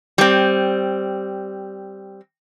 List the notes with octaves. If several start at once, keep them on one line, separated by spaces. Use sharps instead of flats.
G3 C4